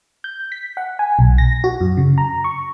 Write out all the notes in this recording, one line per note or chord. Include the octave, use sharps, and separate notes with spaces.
G6
B6
F#5
G#5
B1
A#6
F#4
F#2
C#3
A#5
C#6